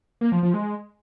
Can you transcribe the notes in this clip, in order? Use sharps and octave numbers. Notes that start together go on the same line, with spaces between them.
A#3
F3
F3
G#3